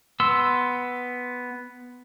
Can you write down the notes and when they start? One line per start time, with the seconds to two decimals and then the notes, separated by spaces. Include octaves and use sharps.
0.20 B3 C6 E6